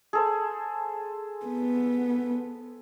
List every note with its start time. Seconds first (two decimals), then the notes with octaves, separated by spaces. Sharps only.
0.13 G#4 A4 C5
1.46 B3